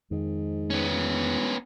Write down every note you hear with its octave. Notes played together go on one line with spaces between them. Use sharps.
F2 G#2 D#3
B3 C#4
E1